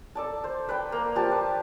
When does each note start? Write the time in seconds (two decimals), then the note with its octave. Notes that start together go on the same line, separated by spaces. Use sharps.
0.15 A4 D5 A5
0.44 C5
0.69 B4 D5 G5
0.92 A#3
1.15 F3 G4 A5
1.32 B4